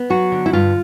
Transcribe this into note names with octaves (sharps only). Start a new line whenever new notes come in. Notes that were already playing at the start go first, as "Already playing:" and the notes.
Already playing: B3
F#3 F#4
D3
E4
G2 F4